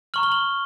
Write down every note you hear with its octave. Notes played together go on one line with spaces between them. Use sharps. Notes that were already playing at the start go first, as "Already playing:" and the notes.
A#5 C#6 F6 F#7
G7
F#7